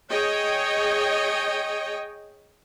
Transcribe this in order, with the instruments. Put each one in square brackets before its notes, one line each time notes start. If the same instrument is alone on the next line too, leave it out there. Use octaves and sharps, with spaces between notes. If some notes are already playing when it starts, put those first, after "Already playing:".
[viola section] G#4 C#5 D#5 G5